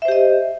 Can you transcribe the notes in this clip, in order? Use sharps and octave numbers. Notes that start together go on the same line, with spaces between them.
G4 C5 D#5 E5